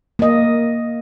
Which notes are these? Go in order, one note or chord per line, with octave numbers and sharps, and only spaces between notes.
A#3 D#5